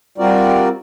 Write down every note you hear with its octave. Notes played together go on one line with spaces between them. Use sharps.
G3 C4 F4 F#4 A#4 D5